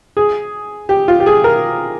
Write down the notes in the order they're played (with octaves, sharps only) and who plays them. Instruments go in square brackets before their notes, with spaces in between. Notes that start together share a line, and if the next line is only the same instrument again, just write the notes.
[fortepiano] G#4
G4
F4
G4
G#4
A#4